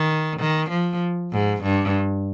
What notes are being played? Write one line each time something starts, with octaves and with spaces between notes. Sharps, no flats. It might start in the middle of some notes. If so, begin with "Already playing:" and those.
Already playing: D#3
D#3
F3
G#2
G2